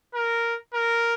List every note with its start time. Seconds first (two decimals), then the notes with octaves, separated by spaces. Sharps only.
0.15 A#4
0.74 A#4